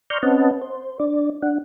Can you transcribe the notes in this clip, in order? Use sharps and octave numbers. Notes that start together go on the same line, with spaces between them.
D5 A#5 C6 C#6 F6 G6
C4 C#4 B4 D#5 F#5 A5
C5
D4 D5
D4 F#5